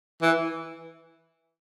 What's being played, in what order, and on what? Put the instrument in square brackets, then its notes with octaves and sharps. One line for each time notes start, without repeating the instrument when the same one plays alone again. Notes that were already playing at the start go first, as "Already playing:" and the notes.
[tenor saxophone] E3